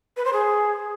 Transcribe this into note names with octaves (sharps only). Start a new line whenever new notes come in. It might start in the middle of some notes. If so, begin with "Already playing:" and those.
B4
C5
G#4